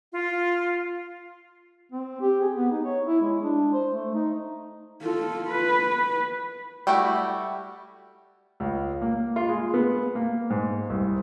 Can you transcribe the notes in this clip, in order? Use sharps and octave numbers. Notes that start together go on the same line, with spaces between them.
F4
C4
G4
G#4
B3
D#4
C#5
E4
G#3
D4
C5
A3
D#4
F4 A4
B4
G3 A3 E4 F#4 G5
C#2
A#3
F4
G#3
B3
A#3
G#2
C2